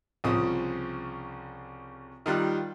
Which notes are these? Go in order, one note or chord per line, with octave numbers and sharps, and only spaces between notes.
C2 C#3 F3 D#6
D#3 G3 F4 F#6